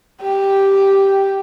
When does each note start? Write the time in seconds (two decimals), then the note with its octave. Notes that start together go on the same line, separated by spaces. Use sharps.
0.22 G4